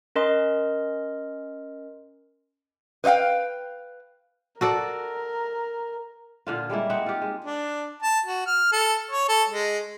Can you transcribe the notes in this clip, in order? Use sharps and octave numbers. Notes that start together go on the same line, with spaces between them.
C#4 A#4 D#5 C6
B4 C5 D#5 F5 G5
F#4 A4 A#4 D5
A#2 D3 F4
G3 G#3 A#3 E4
C4 D#4 F#5
F4 G4
G#3
D4
A5
F#4
F6
A4
C#5
A4
G#3